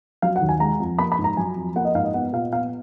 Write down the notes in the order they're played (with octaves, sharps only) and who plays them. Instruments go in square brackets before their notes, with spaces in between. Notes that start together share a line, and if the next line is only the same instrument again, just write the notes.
[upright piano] F#3 F5
F#5
D#2
G#5
G#3 A#5
F2
A#3 B5
B5
G#2
A#5
F#3 G#5
F2
A#3 F#5
D#5
G#2 F5
D#5
B3 F#5
A#2 F5
B3 F5